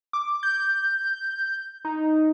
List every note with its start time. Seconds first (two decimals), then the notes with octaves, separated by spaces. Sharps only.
0.13 D6
0.43 G6
1.85 D#4